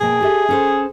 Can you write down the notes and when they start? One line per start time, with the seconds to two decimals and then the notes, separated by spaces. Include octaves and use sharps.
0.01 B2 A#3 G#4 G5
0.21 G4 A4 E5
0.49 C#4 A4 C5